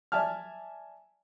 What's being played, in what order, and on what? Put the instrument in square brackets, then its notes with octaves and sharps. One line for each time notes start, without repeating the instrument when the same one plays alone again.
[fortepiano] D5 E5 G#5 A5 F6